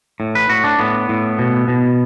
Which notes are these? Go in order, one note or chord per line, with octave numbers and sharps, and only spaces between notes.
A2
B4
A2 F#4
D4
A2 B3
A2
B2
B2